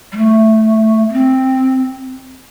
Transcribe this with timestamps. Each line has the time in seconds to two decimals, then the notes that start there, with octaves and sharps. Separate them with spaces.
0.12 G3
0.17 A3
1.09 A#3
1.13 C4